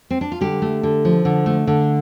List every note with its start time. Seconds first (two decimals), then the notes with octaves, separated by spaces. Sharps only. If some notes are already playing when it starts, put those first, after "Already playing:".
0.11 C4
0.21 D4
0.32 F4
0.41 D3 G3 G4
0.62 A3
0.83 D3
1.05 F3
1.25 D3
1.46 A3
1.67 D3